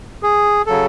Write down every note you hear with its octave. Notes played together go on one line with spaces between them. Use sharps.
G#4
C#3 F#3 A4